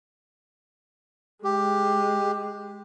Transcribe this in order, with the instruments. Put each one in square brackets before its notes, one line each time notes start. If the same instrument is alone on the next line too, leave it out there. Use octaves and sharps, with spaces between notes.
[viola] G#3 [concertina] G4